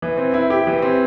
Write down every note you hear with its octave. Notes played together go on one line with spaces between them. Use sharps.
E3
C4
E4
G4
E3
C4